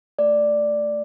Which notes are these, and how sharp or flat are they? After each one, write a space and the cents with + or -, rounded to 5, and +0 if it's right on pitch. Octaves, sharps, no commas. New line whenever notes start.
A3 +10 D5 +0